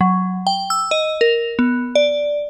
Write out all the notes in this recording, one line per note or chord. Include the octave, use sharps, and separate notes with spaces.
F#3
G5
E6
D#5
A#4
B3
D5